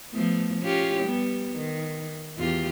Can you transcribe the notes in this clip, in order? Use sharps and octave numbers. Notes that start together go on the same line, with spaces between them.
F3 A3 B3
C#4 F4 G4
G3 B3
D#3
E2 F4 G4